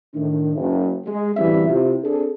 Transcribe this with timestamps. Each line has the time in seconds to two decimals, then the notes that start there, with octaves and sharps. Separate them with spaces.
0.14 A2 D#3 D4
0.56 F#1
1.05 G#3
1.37 A1 D2 E3 G3 C4 E5
1.68 C3 E4 F4
2.03 C4 D4 G#4 A4